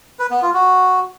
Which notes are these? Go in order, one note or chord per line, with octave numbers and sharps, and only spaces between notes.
B4
B3
F4
F#4